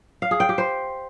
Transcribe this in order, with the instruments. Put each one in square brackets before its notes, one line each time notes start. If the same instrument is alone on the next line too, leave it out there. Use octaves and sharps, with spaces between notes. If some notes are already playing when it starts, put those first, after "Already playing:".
[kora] F5
G#4
G5
G4
C5